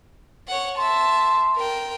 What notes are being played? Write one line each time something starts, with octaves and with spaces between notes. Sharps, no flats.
C#5 F#5
E5 A5 C6
A#4 G5